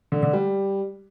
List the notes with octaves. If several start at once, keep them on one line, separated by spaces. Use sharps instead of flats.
D3
D3
G3